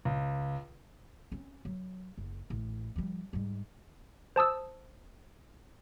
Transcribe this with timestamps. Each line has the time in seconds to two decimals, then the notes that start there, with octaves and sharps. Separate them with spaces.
0.05 C#2
1.32 C4 C#4
1.65 F#3
2.18 F#1
2.50 A1
2.96 F3 G3
3.33 G#2 G3
4.36 C5 A5 D#6 E6